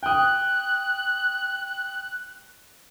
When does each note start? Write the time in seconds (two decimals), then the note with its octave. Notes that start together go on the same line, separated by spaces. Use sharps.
0.03 G5 D#6 F#6